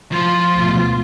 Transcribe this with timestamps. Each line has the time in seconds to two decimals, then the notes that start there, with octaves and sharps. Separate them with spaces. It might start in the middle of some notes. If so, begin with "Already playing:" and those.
0.12 F3 F4
0.53 D2 G#2 B2